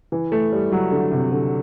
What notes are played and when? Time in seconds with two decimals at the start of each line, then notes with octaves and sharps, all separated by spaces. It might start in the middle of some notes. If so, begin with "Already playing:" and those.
0.12 E3
0.32 A3
0.52 G3
0.72 F#3
0.91 D3
1.12 C3
1.32 D3